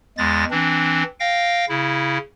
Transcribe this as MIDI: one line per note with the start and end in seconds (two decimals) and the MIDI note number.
0.18 0.45 40
0.18 0.45 56
0.18 0.45 93
0.18 0.45 94
0.51 1.03 52
0.51 1.03 60
0.51 1.03 62
1.20 1.65 77
1.20 1.65 79
1.20 1.65 94
1.69 2.18 49
1.69 2.18 64